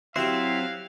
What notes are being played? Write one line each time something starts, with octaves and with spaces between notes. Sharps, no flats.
F#3 C4 E4 F#4 G4 C5 E5 F5